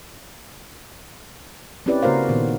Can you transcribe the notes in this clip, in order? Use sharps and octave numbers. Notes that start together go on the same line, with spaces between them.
C4 C#4 E4 G4 B4 D5
C#3 A#3 F#4 A#4 C5 F5
A#2 D#3 B3